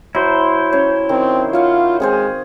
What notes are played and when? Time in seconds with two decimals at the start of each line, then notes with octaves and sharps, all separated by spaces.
0.15 F#3 E4 C5
0.73 C#4 C#5
1.09 D#3 C4
1.53 F4 C#5 F5 F#5
2.00 G#3 C4 G#4 C5